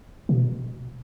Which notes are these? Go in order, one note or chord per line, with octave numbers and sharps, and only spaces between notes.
B2